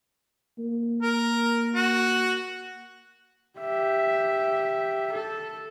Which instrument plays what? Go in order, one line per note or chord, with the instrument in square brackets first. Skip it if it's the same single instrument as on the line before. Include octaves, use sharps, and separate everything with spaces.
[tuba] A#3
[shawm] A#4
F#4
[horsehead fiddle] G4 E5
A4